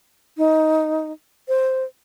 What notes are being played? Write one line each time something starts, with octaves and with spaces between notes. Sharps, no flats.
D#4
C5